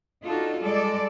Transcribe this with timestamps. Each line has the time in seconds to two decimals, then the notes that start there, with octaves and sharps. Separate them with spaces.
0.23 D4 D#4 F4 F#4 A4
0.61 G3 G#3 A4 D5